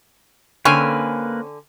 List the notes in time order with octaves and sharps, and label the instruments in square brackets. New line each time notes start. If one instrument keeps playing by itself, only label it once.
[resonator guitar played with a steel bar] D3 G#5 [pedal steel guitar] A#3 B4 [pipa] C4 C#4